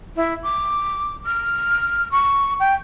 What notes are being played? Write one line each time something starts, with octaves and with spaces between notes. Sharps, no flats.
E4
D6
F6
C#6
G5